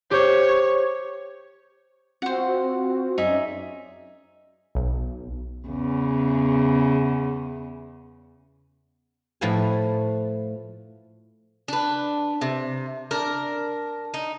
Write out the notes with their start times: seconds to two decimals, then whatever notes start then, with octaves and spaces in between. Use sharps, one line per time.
0.11 G4 C5 C#5
2.22 C4 F4 F#4 C5 F#5
3.18 F#2 C#4 D#4 G#4 D5 E5
4.75 B1
5.67 E2 C#3
9.41 A2 F3 A3 B4 F5 G#5
11.68 D4 B4
12.41 C3
13.11 D4 A#4
14.14 D#4